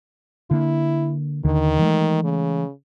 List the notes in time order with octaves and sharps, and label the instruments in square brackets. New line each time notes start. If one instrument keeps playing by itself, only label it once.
[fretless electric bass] D3 A#3 [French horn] E4
[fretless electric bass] D#2 D3 [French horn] D#3
[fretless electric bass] E3 G#3 A3
[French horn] C#3